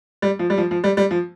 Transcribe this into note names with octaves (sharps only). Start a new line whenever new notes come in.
G3
F3
G3
F3
F3
G3
G3
F3